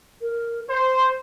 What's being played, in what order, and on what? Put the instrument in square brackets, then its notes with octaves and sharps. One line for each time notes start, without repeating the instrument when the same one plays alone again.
[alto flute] A#4
[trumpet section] C5 [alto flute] C6